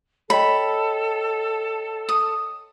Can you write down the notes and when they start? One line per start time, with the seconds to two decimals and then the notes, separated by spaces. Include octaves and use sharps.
0.30 A4 C#5 D#5 G5 B5
2.09 D#6